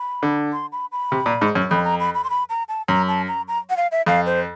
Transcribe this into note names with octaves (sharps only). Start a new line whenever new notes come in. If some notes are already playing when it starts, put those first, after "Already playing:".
Already playing: B5
D3
C6
B5
B5
C3
A#2
G#2
F#2
F2 B5
A#5
B5
B5
C6
B5
A#5
A5
F#2 A#5
A5
A#5
A#5
F#5
F5
E5
F2 F5
C5